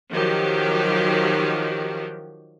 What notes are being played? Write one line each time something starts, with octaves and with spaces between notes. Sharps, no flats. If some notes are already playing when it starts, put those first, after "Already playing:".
D#3 F3 F#3 G4